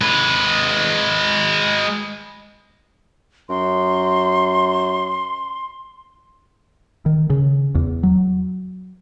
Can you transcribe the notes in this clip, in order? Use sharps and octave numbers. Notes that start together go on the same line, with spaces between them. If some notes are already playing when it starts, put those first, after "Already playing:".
G#3 B4
F#2 C6
D#3
C#3
E2
F#3